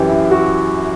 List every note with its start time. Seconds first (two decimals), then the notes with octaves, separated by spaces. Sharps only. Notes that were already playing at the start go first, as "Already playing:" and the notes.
Already playing: F#2 E3 G4
0.10 E4
0.31 F#4